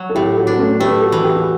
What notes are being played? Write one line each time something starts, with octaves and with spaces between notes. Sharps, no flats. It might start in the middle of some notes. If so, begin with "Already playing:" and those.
Already playing: F#3
A4
A2 E4 G4
F#4 A4
B3 D4
A3 C#4
A3 G4 B4
F#4 A4
E3
G4
F#4